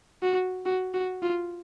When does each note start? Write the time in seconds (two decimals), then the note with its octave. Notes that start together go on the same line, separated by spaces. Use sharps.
0.22 F#4
0.65 F#4
0.94 F#4
1.23 F4